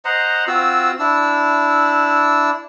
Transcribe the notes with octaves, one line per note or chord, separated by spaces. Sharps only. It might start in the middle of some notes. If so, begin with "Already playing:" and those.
C5 D#5 F#5 A#5
C4 F4 F#4 E6
D4 E4 E6